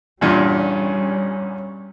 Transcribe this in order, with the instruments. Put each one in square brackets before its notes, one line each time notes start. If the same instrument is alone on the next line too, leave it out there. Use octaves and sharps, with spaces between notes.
[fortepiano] E2 G2 A#2 [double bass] G3 C#4